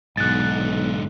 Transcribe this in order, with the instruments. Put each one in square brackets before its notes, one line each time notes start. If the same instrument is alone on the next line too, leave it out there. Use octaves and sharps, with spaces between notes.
[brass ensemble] B1 [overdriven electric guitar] G#2 D3 [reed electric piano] F#6 A6